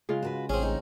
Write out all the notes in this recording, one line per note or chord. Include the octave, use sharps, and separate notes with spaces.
C#3 G#3 F4
F#4 A#4 B4
A1 C4 C#4 G#4
D#4